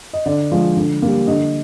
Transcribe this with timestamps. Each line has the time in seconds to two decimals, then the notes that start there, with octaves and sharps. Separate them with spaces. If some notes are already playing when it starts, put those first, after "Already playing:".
0.13 D#5
0.26 D3 D5
0.51 F3 G#3 D4 F4
0.77 D3
1.02 G3 A#3
1.27 D3 D#5